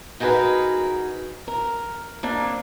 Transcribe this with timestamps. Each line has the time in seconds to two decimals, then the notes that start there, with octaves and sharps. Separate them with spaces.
0.20 D#4 F#4 G#4 A#4 B4
1.48 A#4
2.23 A#3 C4 D4